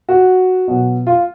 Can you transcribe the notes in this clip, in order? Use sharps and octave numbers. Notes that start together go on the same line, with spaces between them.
F#4
B2 F#3
F4